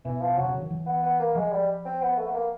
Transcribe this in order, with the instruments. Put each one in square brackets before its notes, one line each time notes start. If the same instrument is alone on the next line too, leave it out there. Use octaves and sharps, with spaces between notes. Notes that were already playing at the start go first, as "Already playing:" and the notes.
[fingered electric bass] B2 [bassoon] E3
[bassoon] F3
[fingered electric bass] C3 [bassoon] F#3
[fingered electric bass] C#3
D3
D#3
E3
[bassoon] B3
B3
A#3
[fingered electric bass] F3 [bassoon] G#3
[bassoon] G3
C4
B3
A3
B3
A#3